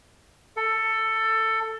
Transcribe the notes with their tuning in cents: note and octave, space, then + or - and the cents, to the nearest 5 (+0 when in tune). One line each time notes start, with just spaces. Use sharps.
A4 +15